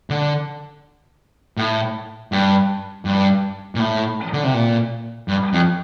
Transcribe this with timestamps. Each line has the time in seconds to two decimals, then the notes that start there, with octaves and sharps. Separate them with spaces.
0.10 D3
1.57 A2
2.32 G2
3.05 G2
3.75 A#2
3.80 A2
4.33 D3
4.44 C3
4.54 A#2
5.28 G2
5.53 F2